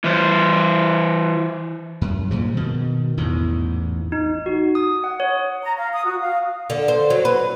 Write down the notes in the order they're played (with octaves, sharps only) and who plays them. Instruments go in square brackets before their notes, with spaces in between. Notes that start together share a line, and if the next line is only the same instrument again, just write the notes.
[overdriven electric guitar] E3 C5
[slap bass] F#2
G2 A#2 C#3 F3
B2 D#3
A1 E2 G#2
[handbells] D#4
F#4
D#6
F#5
C#5
[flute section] A#5
F5
D#6
F#4
F5
[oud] D3
C5
F#3
B4